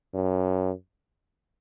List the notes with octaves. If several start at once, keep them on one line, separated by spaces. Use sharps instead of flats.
F#2